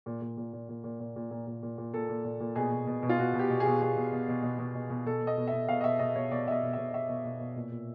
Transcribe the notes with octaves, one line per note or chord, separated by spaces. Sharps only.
A#2
A#2
A#2
A#2
A#2
A#2
A#2
A#2
A#2
A#2
A#2
A#2
A#2 A4
A#2
A#2
A#2
B2 G#4
B2
B2
B2
F4
B2 F#4
B2
G4
B2
G#4
B2
B2 G#4
B2
B2
B2
B2
B2
B2
B2
B2 A4
B2
D#5
B2
B2 E5
B2 F5
D#5
B2 E5
B2 D#5
B2 C#5
B2 D5
B2 D#5 E5
B2
B2 E5
B2 E5
B2
B2
B2
A#2
A#2